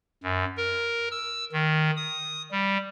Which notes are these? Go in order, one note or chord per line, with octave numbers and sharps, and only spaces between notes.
F#2
A#4
E6
D#3
D#6
G3